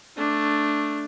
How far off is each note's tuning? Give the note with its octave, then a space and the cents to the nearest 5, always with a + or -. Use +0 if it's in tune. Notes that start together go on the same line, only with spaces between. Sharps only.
A3 +0 D4 +0